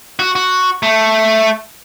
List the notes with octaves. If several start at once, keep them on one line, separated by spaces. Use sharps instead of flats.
F#4
F#4
A3